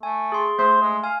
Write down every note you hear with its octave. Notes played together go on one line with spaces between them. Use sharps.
A3 G#5
G#4 C6
A3 C5 C6
G#3
F5 G#5